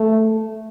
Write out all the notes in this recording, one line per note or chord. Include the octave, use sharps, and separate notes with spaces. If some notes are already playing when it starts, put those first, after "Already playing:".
Already playing: A3